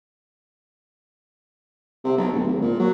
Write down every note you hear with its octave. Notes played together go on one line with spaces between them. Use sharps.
C3
B1
D1
G#1
A#2
F#3